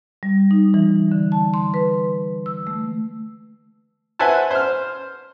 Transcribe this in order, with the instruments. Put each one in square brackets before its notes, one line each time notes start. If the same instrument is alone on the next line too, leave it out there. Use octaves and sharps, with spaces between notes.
[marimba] G3
D#4
E3
D3
A5
C6
B4
E6
A3
[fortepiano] B4 C5 E5 F#5 G#5 A5
C5 F6